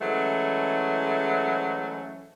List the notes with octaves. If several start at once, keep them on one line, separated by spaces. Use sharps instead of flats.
E3 F#3 G#3 A3 C#4 C5